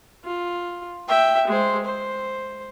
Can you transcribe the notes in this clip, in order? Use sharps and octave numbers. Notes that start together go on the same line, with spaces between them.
F4
E5 G5
G#3 C5
C5